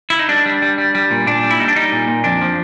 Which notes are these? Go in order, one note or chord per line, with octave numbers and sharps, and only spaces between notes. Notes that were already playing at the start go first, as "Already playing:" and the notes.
E4
D#4
G3 D4
G3
G3
G3
G3
A#2
A#2 D4
G3
E4
G3 D#4
D4
G3 D#4
A#2
A#2
F2 D4
F3